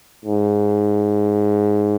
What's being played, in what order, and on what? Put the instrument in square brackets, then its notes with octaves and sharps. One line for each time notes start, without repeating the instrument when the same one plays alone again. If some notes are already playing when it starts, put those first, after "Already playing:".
[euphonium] G#2